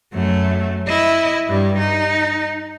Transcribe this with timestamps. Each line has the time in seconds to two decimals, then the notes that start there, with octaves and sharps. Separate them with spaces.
0.13 F#2 A3
0.88 E4 D#5
1.48 G2 G3
1.79 D#4